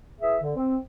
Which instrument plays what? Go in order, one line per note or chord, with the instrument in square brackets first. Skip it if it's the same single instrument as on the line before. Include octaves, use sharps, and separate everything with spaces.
[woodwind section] E3 G#4 E5
D3
C4